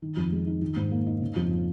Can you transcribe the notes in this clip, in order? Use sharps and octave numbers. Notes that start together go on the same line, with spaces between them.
D#3
F2
G#3
D#4
D#3
G#2
A#3
D#4
C#3
F2
F3